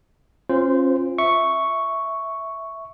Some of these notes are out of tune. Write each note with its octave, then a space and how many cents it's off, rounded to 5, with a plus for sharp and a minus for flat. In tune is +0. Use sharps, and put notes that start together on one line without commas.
C#4 -40 F4 +0 C5 -20
E5 -5 C#6 +0